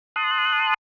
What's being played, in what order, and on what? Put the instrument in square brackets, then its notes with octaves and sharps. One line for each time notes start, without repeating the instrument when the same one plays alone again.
[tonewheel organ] A5 C6 D#6 F#6